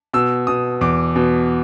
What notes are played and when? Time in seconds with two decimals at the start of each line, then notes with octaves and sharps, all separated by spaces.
0.13 B2 E6
0.47 B2 D#6
0.81 E2 D6
1.16 B2